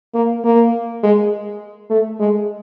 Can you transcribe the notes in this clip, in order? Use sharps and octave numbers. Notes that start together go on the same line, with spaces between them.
A#3
A#3
G#3
A3
G#3